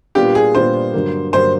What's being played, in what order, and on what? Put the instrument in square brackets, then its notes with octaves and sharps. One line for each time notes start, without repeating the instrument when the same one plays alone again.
[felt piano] A#2 G3 B3 D4 F4 [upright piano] G4
[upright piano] G#4
[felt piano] A#2 G3 B3 D4 F4 [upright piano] C5
[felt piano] G2 D3 F#3 A#3
[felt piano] G2 D3 F#3 A#3 [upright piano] C5